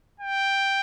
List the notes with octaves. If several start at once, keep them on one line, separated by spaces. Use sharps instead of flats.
G5